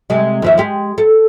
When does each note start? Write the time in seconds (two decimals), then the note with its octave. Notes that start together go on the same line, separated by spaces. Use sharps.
0.10 C3 G#3
0.42 D#2 F3 E5
0.58 G#3 G4
0.98 A4